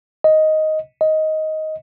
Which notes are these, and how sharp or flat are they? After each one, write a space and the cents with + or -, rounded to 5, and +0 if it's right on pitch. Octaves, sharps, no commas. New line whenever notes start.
D#5 +5
D#5 +10